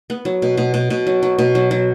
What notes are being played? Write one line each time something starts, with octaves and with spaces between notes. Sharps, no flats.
B3
F#3
B2
B2
B2
B2
F#3
F#3
B2
F#3
F#3